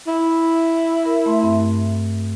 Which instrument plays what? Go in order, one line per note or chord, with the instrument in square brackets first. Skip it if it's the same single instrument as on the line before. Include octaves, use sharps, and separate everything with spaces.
[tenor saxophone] E4
[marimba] A#4
A3 E5 C6
G2 C4 C6